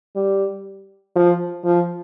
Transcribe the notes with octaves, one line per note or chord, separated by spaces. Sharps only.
G3
F3
F3